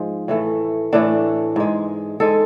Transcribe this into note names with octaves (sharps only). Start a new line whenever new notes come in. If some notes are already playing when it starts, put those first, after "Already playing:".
Already playing: G#2 F3 G#3
A2 E3 A3
A2 E3 A3 D4
G#2 G#3
G#2 G#3 A4